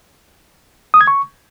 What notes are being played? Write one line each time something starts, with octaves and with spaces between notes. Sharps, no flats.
D#6
G#6
C#6